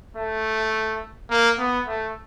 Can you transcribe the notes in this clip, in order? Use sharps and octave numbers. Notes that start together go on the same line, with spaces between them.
A3
A#3
B3
A3